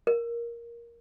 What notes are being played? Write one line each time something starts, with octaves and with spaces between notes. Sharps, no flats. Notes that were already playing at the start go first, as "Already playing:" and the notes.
A#4